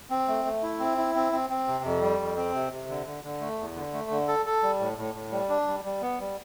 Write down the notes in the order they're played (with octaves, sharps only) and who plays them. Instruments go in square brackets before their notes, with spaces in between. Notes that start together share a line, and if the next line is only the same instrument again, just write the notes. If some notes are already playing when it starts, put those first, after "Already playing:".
[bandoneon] C4
A3
A3
E4
C4
E4
C4
C4
C4
C3
F2
G3
F2
C4
C3
C3
D3
D3
D3
A3
E2
D3
A3
D3
A4
A4
G3
A2
A2
A2
G3
D4
G3
G3
B3
G3